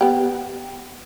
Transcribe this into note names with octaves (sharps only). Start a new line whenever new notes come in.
B3 G4